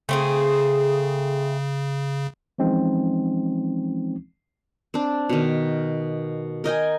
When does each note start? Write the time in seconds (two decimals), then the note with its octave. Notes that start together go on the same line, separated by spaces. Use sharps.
0.09 C#3 A3 C4 G#4
2.58 E3 F3 G#3 C4 C#4 D#4
4.94 C4 D4
5.29 B2 D#3
6.64 A#4 D#5 G5 G#5